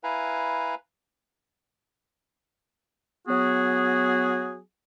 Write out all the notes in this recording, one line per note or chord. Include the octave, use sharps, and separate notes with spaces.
E4 B4 F5 G#5 A#5
F#3 B3 F#4 G#4